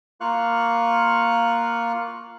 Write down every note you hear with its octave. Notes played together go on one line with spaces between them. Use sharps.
A#3 F4 F5 C#6 F#6